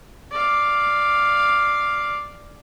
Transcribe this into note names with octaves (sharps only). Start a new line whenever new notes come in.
D5 F5